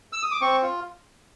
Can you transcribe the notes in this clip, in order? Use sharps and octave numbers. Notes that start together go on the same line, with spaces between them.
E6
D#6
D6
C4 C#6
F4